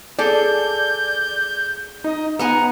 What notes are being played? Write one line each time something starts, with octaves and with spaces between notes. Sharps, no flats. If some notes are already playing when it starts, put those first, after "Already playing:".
G#4 A4 D5 G6
D#4 D#5
B3 F#5 G#5 A#5